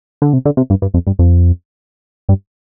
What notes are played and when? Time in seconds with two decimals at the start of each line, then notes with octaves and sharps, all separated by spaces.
0.22 D3
0.33 C3
0.45 D3
0.57 C3
0.70 G2
0.82 G2
0.94 F2
1.07 G2
1.19 F2
2.29 G2